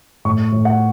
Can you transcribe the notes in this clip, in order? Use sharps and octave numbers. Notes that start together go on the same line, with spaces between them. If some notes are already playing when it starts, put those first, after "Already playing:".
A2 C#6
A2
F#5